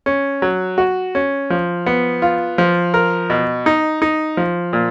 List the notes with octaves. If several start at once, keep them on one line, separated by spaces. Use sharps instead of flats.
C#4
F#3
F#4
C#4
F3
B3
F4
F3
A#4
B2
D#4
D#4
F3
A#2